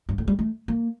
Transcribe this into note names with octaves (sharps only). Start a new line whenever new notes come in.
G2
A2
G3
A3
A#3